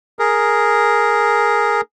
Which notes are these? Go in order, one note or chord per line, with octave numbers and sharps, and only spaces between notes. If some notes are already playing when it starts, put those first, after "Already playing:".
G#4 A#4